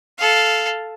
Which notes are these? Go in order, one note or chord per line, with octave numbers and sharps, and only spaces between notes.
A4 F5